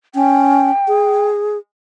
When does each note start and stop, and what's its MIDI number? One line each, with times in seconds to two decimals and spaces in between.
0.15 0.71 61
0.15 1.25 79
0.88 1.58 68